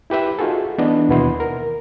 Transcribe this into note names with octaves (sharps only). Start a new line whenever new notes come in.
E4 G4 B4 E5
D#4 F4 F#4 G#4 A4
E3 B3 D4 D#5
D#2 B2 B3 E4 C6
A#4